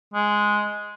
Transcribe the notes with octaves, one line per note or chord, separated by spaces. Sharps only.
G#3